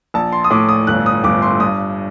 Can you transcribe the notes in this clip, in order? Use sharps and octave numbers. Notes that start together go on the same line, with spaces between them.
A#1 A5
C6
D#6
A2 D6
D#6
G1 F#6
D#6
G1 D6
C6
G2 D#6